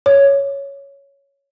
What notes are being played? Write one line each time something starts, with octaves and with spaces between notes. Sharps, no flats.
C#5